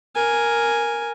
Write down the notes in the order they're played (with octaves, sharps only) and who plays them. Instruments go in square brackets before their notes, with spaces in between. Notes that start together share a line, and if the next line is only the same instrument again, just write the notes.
[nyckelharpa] A#4 G#5